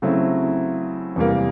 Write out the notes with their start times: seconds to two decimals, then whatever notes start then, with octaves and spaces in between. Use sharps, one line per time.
0.02 C#3 F#3 A3 C4 E4
1.16 E2 C3 E3 G3 A#3